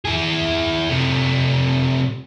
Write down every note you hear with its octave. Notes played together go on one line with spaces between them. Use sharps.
E4 G#4
C3 A3